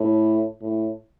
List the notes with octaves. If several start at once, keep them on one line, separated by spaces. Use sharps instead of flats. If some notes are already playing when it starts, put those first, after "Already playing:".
Already playing: A2
A2